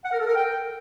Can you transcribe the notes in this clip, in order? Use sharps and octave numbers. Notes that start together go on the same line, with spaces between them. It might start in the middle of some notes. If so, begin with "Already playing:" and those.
F#5
A#4
A4
A#4
G5